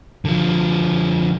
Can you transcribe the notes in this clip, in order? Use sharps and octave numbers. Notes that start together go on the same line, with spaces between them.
D3 F3